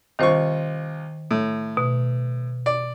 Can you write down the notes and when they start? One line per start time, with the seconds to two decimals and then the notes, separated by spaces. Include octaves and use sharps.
0.19 C2 D#3 F4 C5 C#6
1.31 A2
1.77 B2
2.66 D5